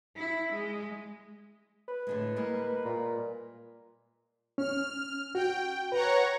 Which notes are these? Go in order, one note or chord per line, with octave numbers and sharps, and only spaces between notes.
E4
G#3
B4
A2 D3 G#3
G3 G#3 A#3
A#2
C#4 F6
F#4 G5
B4 C#5 F#5 A#5